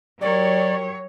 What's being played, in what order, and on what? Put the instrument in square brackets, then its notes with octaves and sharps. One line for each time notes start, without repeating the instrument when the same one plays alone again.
[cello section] F#3 C#5 [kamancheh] G4 A#4 [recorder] D5